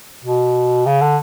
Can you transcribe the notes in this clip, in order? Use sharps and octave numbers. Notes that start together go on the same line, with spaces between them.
B2
C#3
D3